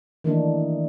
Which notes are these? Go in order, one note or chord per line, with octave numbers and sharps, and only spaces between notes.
D#3 E3 A3 A#3 D4 D#4